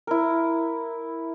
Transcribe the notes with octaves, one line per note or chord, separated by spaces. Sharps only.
E4 A#4